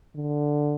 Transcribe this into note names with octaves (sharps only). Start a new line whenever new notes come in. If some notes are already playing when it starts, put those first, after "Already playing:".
D3